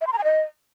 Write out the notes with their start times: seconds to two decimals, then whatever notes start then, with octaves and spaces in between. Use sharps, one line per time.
0.01 E5
0.07 C6
0.13 A#5
0.18 G#5
0.24 D#5